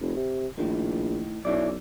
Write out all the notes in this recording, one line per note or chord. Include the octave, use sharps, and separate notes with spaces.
F1
C3
A#1 A2 D#3
B1 C#4 E4 D5